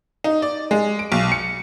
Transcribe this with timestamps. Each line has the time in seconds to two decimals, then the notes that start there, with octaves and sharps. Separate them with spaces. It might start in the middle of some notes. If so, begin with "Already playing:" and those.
0.24 D#4
0.42 D5
0.71 G#3
0.99 D7
1.12 B1
1.32 C#7